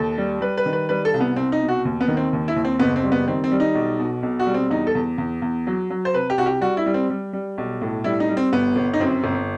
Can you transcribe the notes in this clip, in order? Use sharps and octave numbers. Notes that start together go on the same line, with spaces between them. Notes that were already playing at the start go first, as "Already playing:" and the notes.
Already playing: D#2 A4
G3
G3 B4
B4
D#3
B4
G3 B4
A4
C2
B3
C2 C4
D#4
B2
F#4
D#2
B3
D#3
C4
D#2
E4
D#2
C4
F#1 B3
C4
G3
B3
D#3 C4
C4
G3
D#4
B1
B2
B1
F#4
G3
C4
E2 D#4
A4
E2
E2
E2
F#3
F#3
C5
C3 B4
G4
C2 F#4
G4
G3 F#4
E4
G3
C4
G3
G3
B1
A2
G3 E4
D#4
G3
C4
G1 B3
G1
D#4
F#2 C4
G1